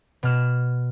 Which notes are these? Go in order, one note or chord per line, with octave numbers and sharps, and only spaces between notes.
B2 F6 E7